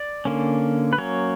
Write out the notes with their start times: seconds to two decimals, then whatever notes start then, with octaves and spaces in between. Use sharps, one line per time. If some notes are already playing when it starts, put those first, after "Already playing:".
Already playing: D5
0.25 D3 A#3 C#4
0.93 B4
0.98 F#3 A#3 C#4 C#5